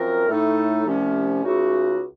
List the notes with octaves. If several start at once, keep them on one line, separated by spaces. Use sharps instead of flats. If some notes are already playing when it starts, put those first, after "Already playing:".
Already playing: F#2 F3 C4 F#4 A#4
A2 A3 D#4 A4
C2 C3 F3 A3 C#4
C#2 C#3 A3 D#4 F#4